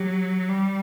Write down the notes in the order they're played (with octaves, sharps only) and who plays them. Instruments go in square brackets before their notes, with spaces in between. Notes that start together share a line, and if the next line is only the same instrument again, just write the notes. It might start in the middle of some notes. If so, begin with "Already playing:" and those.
Already playing: [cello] F#3 [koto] G4
[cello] G3